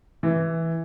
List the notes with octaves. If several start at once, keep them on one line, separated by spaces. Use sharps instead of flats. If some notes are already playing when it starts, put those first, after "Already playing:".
E3